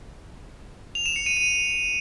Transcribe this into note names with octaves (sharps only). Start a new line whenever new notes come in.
F7
E7
C#7
D#7
D#7